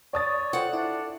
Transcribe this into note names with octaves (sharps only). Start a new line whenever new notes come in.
C#5 D5 D#6 A6
F4 A4 C5 F#5 G5
D4 E4